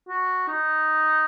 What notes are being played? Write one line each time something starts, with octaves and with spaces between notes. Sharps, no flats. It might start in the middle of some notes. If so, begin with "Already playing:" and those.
F#4
D#4